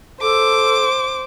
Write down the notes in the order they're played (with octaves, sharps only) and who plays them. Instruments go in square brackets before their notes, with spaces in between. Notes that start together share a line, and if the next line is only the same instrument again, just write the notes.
[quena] A4 [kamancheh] C5 [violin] D6